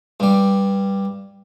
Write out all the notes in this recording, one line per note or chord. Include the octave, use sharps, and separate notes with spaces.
G2 G3